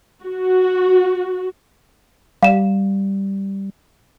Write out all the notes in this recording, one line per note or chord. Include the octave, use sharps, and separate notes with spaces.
F#4
G3 F5 E7